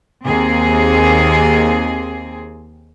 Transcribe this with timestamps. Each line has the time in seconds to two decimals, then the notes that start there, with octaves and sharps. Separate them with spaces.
0.24 D#2 C4 G#4